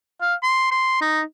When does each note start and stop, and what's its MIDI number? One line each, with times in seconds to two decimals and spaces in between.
0.22 0.35 77
0.43 0.67 84
0.71 0.99 84
1.01 1.21 63